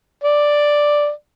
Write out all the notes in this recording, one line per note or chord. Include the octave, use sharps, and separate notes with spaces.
D5